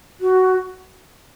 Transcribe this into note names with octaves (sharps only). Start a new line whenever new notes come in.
F#4